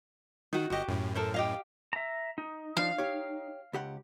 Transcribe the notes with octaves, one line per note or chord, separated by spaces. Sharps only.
D#3 D#4 F#4
G1 F#4 G4 D#5
F#2 A2
A4 A#4 C5
G4 D#5 F5
E5 A#5
D#4
F3 D4 F5
G4 C#5
C#2 G4 F#5